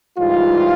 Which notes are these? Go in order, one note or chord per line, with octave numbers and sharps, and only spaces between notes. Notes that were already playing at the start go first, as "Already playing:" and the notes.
G#2 E3 G3 F4